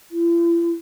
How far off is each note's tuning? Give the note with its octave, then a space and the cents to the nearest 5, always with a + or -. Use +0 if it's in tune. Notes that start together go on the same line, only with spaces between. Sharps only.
E4 +45